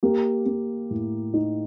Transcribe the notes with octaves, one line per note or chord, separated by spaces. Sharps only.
A#3 G4
A#3
A2
D#4